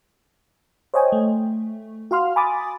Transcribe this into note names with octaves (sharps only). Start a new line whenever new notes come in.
C5 C#5 D#5 G5 G#5
A3
F#4 F5 C6 F6
G#5 B5 D6 D#6 A6